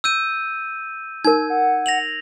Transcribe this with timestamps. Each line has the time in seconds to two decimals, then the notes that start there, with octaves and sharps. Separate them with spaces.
0.04 E6 G6 D#7
1.25 D#4 A#4 G#6
1.50 F#5
1.86 A#6 F7 F#7